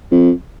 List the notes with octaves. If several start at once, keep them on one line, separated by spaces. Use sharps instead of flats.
F2